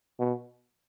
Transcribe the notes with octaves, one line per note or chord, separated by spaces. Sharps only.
B2